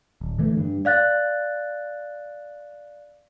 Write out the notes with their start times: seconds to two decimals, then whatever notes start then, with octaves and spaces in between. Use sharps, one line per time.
0.21 D1
0.39 D3 E3 A3
0.57 G2
0.85 D5 F5 F#6 A6